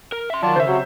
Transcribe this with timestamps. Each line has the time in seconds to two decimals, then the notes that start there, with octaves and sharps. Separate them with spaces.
0.12 A#4
0.30 E5 C6
0.43 D#3 F#3 F4 D5 A5
0.56 C#3 C5 E5
0.67 C3 F#3 F#4